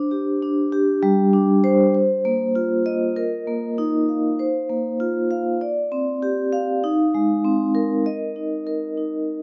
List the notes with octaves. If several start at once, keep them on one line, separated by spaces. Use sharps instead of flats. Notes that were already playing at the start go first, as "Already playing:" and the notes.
Already playing: D4 C5
G4
D4
G4
G3
D4
C5
C5
A#3
F4
D#5
A#4
A#3
D#4
F5
C5
A#3
F4
F5
D5
C4
G4
F5
D#4
G#3
C4
A#4
D#5
D#4
A#4
D#4